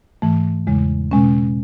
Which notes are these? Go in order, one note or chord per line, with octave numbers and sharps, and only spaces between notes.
G#2 E3 A3
E2 C#3 G#3
B2 G#3 C#4